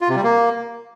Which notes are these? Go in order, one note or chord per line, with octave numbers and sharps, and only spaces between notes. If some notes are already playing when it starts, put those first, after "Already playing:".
F4
C3
G3
A#3